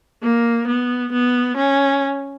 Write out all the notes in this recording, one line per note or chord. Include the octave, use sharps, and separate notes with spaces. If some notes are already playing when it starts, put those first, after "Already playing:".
A#3
B3
B3
C#4